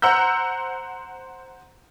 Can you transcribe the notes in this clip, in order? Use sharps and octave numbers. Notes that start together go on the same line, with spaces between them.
C5 F#5 A#5 E6 G6